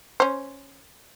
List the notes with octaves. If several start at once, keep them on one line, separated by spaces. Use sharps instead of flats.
C#4 C5